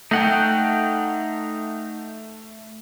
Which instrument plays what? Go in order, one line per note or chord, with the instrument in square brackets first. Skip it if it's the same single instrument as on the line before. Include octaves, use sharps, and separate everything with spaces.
[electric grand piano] A3 [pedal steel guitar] D#4 F#5 G5